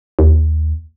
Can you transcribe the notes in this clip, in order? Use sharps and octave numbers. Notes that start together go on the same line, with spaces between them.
D#2